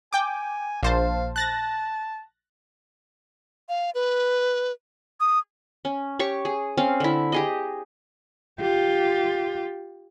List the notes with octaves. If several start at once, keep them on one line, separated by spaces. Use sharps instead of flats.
G5 G#5 D6
A#1 C5 F5 A5
A5 F#6 A6 A#6
F5
B4
D#6
C#4
G4 C#5 C#6
G#4
C4 C#4 F5
D3 E4
G4 G#4 D#5
F4 G4